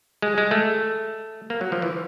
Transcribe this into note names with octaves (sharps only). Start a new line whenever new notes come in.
G#3
G#3
A3
A#3
F#3
F3
E3